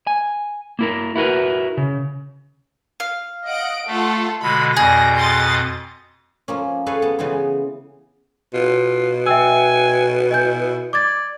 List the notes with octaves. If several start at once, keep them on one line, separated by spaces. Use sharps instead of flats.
G#5
A#3 E4 A#4
E4 F#4 A#4 B4
C#3
F5
D#5 F#5 D7
A3 F4 A4 F#5
B2 D3 G#3 B5
F2 B2 G#4 D5 G6 A#6
C6 D#6 A6
F3 A#3 C#4
G#4 A4 B4 C#5 F5 G#5
B3 A5
C#3 E3 B3 F4 G#4
B2 F4
E5 G5 G#5 E6
E4 D#5 G#5 G6
D5 D6 G#6 A6